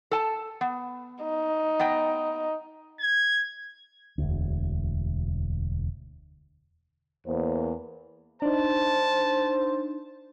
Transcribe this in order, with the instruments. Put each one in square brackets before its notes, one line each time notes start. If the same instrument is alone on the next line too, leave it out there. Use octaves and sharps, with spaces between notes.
[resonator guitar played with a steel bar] A4 G#5 A5
B3
[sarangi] D#4
[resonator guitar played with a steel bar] B3 D#5 G5
[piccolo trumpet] G#6
[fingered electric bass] E1 D2
[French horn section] E2 A#3 C5
[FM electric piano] D4 D#4 [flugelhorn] C5 [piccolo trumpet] A5